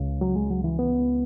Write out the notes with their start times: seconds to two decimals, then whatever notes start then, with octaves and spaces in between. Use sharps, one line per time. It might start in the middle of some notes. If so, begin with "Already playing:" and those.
Already playing: C#2 C#3
0.21 F#3
0.36 G#3
0.50 F#3
0.64 E3
0.79 B3